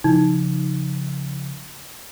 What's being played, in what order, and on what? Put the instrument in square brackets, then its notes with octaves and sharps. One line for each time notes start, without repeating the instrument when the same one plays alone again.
[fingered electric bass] C#3 F3 [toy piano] D#4